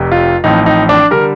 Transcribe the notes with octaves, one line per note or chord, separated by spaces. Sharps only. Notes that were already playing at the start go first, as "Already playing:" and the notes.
Already playing: F1 F2 C3
F4
A1 A2 F3 C4 D#4
D#4
D4
D3 G3 A#4